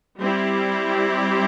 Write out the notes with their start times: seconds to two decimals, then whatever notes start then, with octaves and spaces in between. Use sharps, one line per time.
0.20 G3 C4 E4 G4